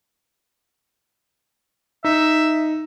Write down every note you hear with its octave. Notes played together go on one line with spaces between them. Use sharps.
D#4 E5